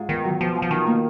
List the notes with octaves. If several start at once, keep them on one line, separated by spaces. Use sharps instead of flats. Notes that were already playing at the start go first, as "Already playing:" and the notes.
Already playing: G#2 F4
D#3 B3
F#3
B2 F3
F4
F3
D#3 D#4
A#3